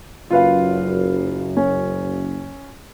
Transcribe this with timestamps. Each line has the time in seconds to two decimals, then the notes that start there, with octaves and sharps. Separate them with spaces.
0.30 F#1 F#2 F4 B4 F5
1.57 C#4